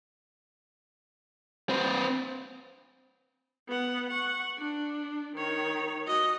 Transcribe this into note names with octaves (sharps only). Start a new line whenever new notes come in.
C4 B4
B3 F#5
F#5 C#6
D4
D#3 C#5
F#4 D#5